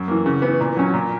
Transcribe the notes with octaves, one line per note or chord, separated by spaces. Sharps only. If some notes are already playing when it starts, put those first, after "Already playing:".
Already playing: F#2
E3 A#3
C#3
E3 B3
A#2
F#3 C#4
A#2